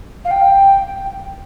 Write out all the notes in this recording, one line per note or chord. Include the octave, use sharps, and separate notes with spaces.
F5
G5